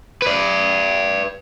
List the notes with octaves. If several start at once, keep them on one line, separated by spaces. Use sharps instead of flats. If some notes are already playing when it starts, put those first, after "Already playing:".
B4 D5